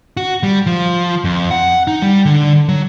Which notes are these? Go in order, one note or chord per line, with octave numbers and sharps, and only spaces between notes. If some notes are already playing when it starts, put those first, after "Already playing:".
F#4
G3
F3
F2
F#5
D#4
G3
D3
F#3